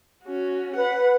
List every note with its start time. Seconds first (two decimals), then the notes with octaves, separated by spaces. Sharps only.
0.24 C#4 F#4
0.76 B4 F#5